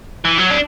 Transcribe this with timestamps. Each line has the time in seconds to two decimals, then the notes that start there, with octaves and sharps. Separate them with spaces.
0.25 E3
0.38 F#3
0.50 D4